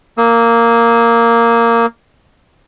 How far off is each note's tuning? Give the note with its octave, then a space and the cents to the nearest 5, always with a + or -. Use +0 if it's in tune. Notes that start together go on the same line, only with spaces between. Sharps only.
A#3 -5 D#6 +45